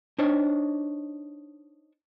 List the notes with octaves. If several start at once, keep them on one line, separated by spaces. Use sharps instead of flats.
D4 D#4 C5 C#5